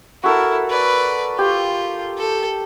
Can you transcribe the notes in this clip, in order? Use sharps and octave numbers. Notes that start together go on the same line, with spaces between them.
E4 F#4 A4 A#4
B4 D5
F4 G4
A4